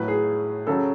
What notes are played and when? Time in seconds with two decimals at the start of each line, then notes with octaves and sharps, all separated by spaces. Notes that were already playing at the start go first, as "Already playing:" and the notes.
Already playing: A2 F#3 B4
0.08 G#4
0.67 C#3 F#3 A4